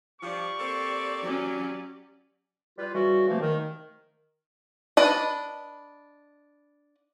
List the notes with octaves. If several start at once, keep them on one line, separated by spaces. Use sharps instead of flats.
G2 F3 G4 D5 C#6
A#3 C4 A4
F#3 C#4
G3 F4 B4
C#3 E3 G3 F#4
C3 E3 F3 A3 A#3
D#3
D4 B4 D#5